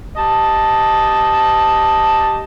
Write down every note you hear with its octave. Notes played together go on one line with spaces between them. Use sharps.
G4 D#5 A5